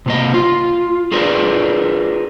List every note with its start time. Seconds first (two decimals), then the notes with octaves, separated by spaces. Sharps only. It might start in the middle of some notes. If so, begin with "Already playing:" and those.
0.06 C3 A#3 D#5
0.34 F4
1.12 F4 G#4 A#4 B4 D5